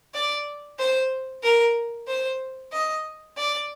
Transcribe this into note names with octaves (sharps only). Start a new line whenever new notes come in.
D5
C5
A#4
C5
D#5
D5